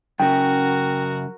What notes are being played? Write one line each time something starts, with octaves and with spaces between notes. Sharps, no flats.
F#2 C#3 F#3 F#4 A#4 G5